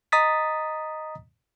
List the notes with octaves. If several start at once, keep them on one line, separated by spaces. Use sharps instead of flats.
D#5 A#5 D#6 A6 B6